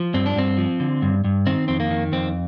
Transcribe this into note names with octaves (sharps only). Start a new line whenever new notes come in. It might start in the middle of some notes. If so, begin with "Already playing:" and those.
Already playing: F3
G2 C4
D4
G2 C4
F3
D3
G2
G2
D#3 C4
F2 C4
A#3
D#3
F2 C4